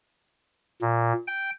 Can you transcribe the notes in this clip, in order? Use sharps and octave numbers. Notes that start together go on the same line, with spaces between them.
A#2
G5